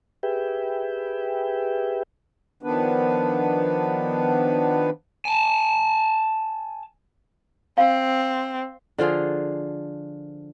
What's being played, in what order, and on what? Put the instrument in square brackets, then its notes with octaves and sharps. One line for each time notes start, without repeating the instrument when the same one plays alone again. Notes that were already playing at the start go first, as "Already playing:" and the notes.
[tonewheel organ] G4 G#4 B4 E5 G5
[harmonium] D#3 F3 B3 D4 B4
[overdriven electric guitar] G#5 A5
[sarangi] C4 [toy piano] F5
[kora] D3 F3 F4 G#4